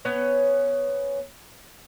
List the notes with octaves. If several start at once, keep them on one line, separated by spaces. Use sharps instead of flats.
B3 C#4 C#5